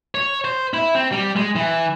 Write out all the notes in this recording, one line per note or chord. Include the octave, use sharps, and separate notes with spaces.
C#5
C5
E4
C4
G3
G#3
E3